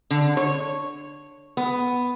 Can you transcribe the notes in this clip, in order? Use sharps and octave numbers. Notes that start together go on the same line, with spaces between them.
D3
C#5
B3